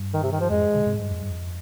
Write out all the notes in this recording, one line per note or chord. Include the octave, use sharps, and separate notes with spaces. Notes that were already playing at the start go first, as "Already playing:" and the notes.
Already playing: G2
D#3
C3
D#3
F3
F2 G#2 G#3
A#2 D3
G#2 C3
G2
F2
G2
F2